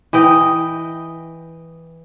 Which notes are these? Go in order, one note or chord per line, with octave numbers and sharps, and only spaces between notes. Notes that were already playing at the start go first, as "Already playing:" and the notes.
E3 D#5 G5